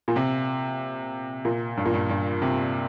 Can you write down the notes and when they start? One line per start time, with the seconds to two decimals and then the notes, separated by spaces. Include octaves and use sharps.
0.08 A#2
0.16 C3
1.45 A#2
1.77 G2
1.85 A#2
1.94 G2
2.09 G2
2.42 C3